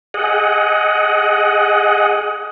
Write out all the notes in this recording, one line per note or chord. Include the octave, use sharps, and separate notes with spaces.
G#4 D#5 F#5